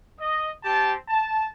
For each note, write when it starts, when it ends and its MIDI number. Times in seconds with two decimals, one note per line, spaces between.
0.20 0.50 75
0.64 0.94 60
0.64 0.94 67
0.64 0.94 81
1.08 1.47 81